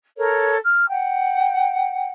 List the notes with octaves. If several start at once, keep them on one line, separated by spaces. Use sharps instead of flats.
A4 A#4 C#5
F6
F#5 G5